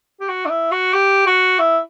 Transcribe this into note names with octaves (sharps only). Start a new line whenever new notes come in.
G4
F#4
D4
E4
F#4
G4
F#4
E4